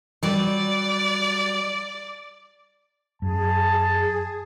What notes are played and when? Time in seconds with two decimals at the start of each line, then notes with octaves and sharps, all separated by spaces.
0.23 F#3 G3 D5
3.22 F#2 G#4 A5